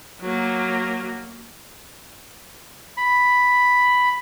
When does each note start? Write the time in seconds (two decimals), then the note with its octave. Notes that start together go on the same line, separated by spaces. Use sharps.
0.22 F#3 A#3
2.97 B5